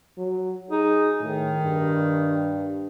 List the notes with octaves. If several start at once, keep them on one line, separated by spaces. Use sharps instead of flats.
F#3
D#4 G#4
A2 D#3
G2